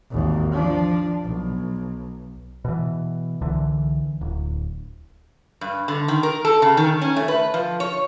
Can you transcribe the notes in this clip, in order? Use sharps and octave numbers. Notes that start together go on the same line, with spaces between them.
G#1 D#2
F3 D4
B1
B2 E3
C2 D3 E3
D1
G2
D3
D#3
A#4
A4
C#3
D#3
C#4
A3
B4
F3
C#5